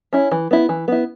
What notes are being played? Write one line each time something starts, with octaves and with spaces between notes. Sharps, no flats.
C#4 E4
E3
B3 E4
E3
B3 E4